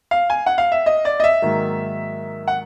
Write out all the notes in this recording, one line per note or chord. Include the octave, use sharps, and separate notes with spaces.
F5
G#5
F#5
F5
E5
D#5
D5
D#5
E5
G#2 D#3 F#3 A#3
F#5